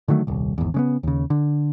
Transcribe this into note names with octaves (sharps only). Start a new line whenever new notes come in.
D3 D#3 F#3 A3
D#1 C2
G#1 E2
C#3 G#3 B3
D#2 C#3
D3